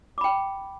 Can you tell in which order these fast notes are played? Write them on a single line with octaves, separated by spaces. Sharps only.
D6 B5 G5